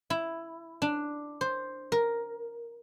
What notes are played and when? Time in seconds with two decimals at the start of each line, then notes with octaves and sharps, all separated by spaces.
0.10 E4
0.82 D4
1.41 C5
1.92 A#4